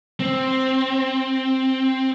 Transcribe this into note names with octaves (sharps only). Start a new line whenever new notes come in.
C4